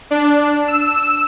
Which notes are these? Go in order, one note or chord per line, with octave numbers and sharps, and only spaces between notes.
D4
E6